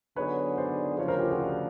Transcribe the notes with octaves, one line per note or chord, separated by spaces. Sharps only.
D3 F#3 B3 D#4 G#4 B4 C#5
C5 D5
D2 C#3 F3 B4 C#5
A#4 C5
F4 G4
F#4 G#4
D4